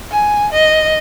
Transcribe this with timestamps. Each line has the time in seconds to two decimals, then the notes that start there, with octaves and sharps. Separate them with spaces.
0.12 G#5
0.53 D#5